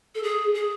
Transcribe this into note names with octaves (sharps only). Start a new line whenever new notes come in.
A4
G#4
G#4